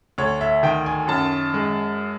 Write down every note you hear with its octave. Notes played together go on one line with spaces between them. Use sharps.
D2 C#5
E5
D#3 G5
G#5
F#2 A5
G#3